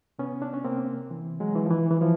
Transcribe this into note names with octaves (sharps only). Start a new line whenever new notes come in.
C3 B3 C#4
D4
C#4
C3 A#3 C4
E3
F#3 G#3
E3
F3
E3
E3
E3 F3